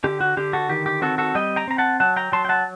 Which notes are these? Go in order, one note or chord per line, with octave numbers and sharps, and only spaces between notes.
D3 G4
F#4
D3 G4
F#4 A4
D#3 G4
G4
C4 F#4 A4
F#4 A4
G3 D#5 G5
G5 A#5
C4 A#5
F#5 A5
F#3 F#5 A5
G5 A#5
F#3 A5 C6
G5
F#5 A5